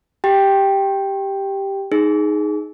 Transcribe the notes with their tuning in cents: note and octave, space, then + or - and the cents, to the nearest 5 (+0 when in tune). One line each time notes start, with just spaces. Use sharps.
G4 +0 G5 +0
D#4 +0 G#4 +10